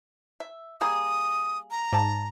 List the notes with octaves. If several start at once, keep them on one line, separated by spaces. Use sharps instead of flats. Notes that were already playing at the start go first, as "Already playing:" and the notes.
E5
G3 A#3 G#4 D#6
A#5
G#2 D5 A5